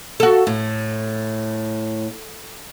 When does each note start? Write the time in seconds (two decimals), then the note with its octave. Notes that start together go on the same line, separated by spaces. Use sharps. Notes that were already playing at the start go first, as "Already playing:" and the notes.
0.20 F#4 A4
0.47 A2